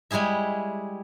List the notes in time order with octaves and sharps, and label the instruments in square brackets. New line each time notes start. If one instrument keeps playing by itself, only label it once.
[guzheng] G3 G#3 E4 G#4 E5